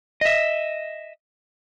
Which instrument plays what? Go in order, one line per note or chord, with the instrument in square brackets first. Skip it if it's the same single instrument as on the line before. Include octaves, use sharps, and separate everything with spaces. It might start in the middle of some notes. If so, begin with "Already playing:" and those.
[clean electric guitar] D#5 E5